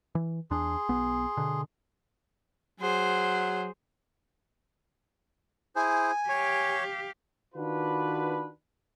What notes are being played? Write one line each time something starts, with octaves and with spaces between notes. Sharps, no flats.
E3
E2 D4 G#4 C6
B1 B3
B2 D3
F#3 G#4 C5
E4 G#4 C5 G#5
G4 C#5 F5 C#6
D#3 D4 F4 F#4 B4